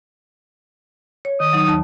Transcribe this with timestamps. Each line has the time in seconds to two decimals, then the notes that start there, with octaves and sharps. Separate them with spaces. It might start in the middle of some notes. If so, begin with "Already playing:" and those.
1.25 C#5
1.40 D#3 D#6
1.53 F#3 D#4
1.68 D#2 A5